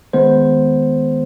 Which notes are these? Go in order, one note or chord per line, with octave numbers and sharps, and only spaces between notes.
D#3 G#3 B3 C5